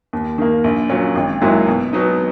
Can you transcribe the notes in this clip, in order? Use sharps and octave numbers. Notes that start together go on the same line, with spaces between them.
D#2
D#3 A#3
A#1
A#2 F#3 C#4
G#1
G#2 F#3 A#3 E4
B2
F#3 B3 D#4